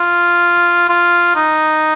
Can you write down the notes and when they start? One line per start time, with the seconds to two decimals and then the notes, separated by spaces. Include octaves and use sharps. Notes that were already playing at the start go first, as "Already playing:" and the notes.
Already playing: F4
0.89 F4
1.36 D#4